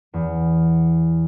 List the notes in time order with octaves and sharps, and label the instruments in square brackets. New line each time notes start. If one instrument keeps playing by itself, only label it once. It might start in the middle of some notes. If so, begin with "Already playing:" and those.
[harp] E2